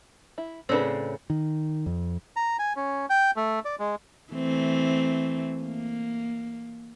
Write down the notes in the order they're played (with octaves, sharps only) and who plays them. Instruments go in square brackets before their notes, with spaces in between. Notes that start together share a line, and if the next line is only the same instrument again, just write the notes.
[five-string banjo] E4
[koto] A2 C#3 [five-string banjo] C4 D4 B4
[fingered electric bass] D#3
F2
[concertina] A#5
G#5
C#4
G5
A3
D5
G#3
[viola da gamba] E3 A3 C4
A#3